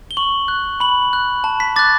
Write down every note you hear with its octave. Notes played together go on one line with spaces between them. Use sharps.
G7
C#6 F#7
F#6
B5 F#7
F#6
A5
B6
D6 F#6 A6